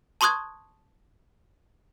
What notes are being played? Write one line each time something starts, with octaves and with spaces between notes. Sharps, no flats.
A5 C6 C#6 D#6 F#6 G#6